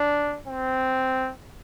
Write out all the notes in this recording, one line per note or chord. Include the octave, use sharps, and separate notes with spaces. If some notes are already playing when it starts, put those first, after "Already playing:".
Already playing: D4
C4